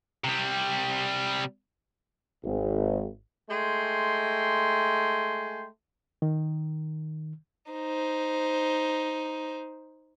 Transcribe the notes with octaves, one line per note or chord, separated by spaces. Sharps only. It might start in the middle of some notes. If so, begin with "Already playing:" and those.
C3 G3
G#1
G#3 A3 G5 C6
D#3
D#4 C5